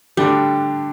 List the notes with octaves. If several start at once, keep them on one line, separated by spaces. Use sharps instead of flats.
D3 G3 A3 D4 G4